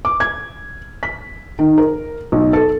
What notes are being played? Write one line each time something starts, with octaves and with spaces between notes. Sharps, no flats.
D6
G#6
B6
D#3
A#4
B1
A4